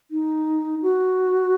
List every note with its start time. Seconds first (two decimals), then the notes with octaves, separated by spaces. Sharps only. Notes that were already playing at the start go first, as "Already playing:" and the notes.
0.11 D#4
0.82 F#4